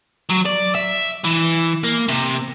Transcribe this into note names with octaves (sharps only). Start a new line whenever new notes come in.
F#3
D5
E5
E3
A#3
C3